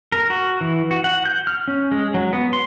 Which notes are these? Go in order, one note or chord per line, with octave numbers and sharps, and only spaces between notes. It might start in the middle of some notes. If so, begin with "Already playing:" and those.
A#4
F#4
E3
F#4
F#5
G6
F6
C#4
G#3
F#3
B3
C6